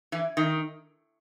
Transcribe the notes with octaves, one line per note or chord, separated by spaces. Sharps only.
E3
D#3